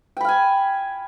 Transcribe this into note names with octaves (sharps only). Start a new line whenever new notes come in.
F5 G5 G#5 B5